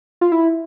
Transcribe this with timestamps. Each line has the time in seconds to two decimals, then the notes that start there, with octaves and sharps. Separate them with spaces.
0.21 F4
0.32 E4